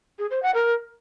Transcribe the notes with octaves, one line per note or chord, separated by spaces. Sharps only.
G#4
C5
F#5
A#4